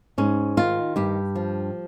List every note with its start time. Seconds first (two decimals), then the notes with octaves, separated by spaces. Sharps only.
0.18 G#2 C#4
0.57 D#3 F4
0.96 G2 G4
1.35 F3